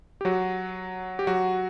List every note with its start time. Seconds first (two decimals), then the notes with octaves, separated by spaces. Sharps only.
0.21 G4
0.25 F#3 F#4
1.19 G4
1.27 F#3 F#4